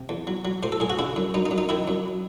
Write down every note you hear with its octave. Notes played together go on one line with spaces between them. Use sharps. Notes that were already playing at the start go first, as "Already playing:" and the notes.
Already playing: C3
E2
F#3
F#3
A2 C5
A4
A2 G#4
F#4
C#3 E4
F#2
F#2 D#4
D#4
F#2
D#4
D#3 E4
F#2